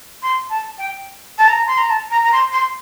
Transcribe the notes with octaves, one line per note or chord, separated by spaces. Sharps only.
C6
A5
G5
A5
A#5
C6
A#5
A5
A#5
A#5
C6
C6